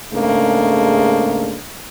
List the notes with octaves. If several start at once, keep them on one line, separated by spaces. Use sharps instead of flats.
G#2 C#3 A3 A#3 D4